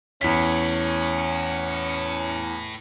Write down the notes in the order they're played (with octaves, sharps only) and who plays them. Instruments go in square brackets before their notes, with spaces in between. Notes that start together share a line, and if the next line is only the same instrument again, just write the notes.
[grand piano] E2 B6 [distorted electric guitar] A2 [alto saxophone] C#4